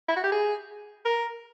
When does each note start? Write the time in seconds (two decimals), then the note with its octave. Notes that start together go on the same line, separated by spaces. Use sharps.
0.09 E4
0.16 F#4
0.24 G4
0.32 G#4
1.05 A#4